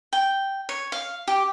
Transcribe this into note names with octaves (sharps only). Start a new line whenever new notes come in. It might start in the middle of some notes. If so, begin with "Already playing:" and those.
G5
C#5
F5
G4